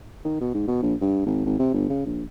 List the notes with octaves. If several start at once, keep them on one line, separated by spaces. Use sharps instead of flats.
D#3
B2
G#2
B2
A#1
G2
G#1
G#1
C3
G1
C#3
A#1